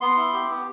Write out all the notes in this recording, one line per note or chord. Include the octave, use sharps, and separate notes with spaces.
B3 C6
E4
G4
B3